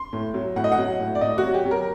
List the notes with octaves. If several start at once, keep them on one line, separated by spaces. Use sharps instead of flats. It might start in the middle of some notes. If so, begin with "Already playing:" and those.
Already playing: C6
A2
F#3
A2 F#5
D#5
F#5
F#3
A2
D5
A2 D#5
F#4
F#3
G4
F#3
A#4